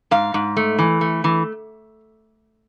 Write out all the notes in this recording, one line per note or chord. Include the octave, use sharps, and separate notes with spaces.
G#2 F5
G#2
A3
E3
A3
E3